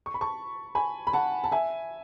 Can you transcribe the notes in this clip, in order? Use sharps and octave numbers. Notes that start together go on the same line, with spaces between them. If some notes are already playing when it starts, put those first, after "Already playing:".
C#6
B5
A5 C#6
G#5 B5
B5
F#5 A5
A5
E5 G#5